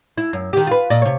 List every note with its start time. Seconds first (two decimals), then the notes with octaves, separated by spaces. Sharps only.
0.18 E4
0.33 F#2
0.53 D#3 G4
0.67 F4 B4
0.90 A#2 D5 D#5
1.02 C3 C#5